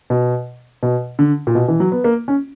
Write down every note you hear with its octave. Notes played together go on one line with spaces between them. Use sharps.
B2
B2
D3
A#2
B2
E3
F#3
B3
A#3
C#4